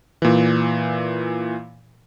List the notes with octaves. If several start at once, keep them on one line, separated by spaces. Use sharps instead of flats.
A#2 E3